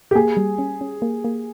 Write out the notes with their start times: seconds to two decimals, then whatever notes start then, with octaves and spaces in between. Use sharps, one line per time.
0.11 G4
0.15 A#3 G#4
0.37 G3
0.58 C#4
0.81 C#4
1.02 A#3
1.24 A#3